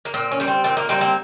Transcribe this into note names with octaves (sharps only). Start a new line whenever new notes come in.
A#3
A#2 C4
C#4
G3 A#3
C4
A#2 C4
A#3
G3 A#3 C4
C4